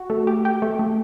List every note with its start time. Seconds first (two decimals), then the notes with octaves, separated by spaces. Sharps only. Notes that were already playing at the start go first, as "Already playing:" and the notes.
Already playing: F#4
0.10 A3
0.27 G4
0.45 G4
0.62 A3
0.79 A3